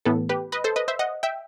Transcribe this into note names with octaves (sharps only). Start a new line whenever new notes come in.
A2 E3 B3 A4
G4 B4
B4 D#5
A4 C5
B4 D#5
C5 E5
D#5 F#5
E5 G5